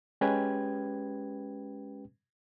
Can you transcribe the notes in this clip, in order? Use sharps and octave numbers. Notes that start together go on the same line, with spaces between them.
G#3 C#4 G4 B4 G5 G#6